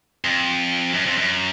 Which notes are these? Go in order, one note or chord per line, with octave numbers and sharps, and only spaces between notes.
F2
F#2
F2
F#2